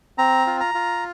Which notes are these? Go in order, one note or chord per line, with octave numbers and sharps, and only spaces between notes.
C4 A#5
F4
A#5
F4